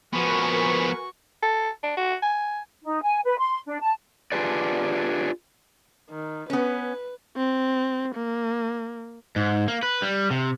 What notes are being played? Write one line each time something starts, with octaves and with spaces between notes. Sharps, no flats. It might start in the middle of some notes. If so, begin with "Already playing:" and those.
F3 B3 F#4 A#4 B4 G#5 C#6
A4
D4
F#4
G#5
D#4
G#5
B4
C6
D4
A5
D4 F4 G4 G#4 B4 D5
D#3
B3 C#4 B4
C4
A#3
G#2
A#3
B4
G3
C3